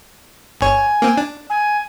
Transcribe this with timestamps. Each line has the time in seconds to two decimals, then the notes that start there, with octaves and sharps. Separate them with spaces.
0.61 G1 C#5 G#5
1.02 A#3 C4
1.17 D4
1.49 G#5